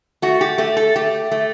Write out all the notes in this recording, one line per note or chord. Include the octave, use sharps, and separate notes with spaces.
A3 F#4
G4
A3 G4
A4
A3 G4
A3